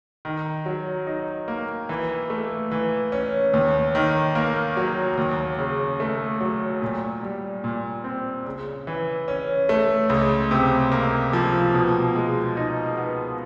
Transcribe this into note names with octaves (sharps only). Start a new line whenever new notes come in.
D#3
F#3
D#4
A#3
E3
A3
E3
C#4
D#2
D#3
A#3
F#3
D#2
C#3
A3
F#3
A#2
G3
A#2
C4
C#3
E3
C#4
A3
C#2
C3
A#3
F3
B2
G#3
D#4
B3